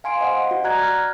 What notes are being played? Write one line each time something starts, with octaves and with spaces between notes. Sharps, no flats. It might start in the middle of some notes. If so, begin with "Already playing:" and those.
F5 G#5 C6 D7
C5 D#5 F#5
F#4
D5 A#5 F#6 G#6 A#6
F6